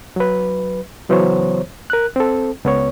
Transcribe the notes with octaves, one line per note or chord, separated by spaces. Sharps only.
F#3 B4
C#3 E3 F#3 B3 C5 C#5
A#4 F#6
C4 A4
C#2 B3 C#5